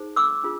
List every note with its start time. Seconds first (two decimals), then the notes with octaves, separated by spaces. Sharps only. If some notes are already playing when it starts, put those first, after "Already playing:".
Already playing: D#4 G#4 C5
0.16 D6 E6
0.43 D4 F4 G#4